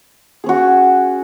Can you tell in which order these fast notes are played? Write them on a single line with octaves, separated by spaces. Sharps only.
G#4 C#4 F#4